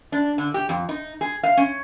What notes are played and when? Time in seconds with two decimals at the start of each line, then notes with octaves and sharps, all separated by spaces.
0.12 D4
0.38 D3
0.54 G4
0.69 F2
0.89 D#4
1.21 G#4
1.43 F5
1.57 C#4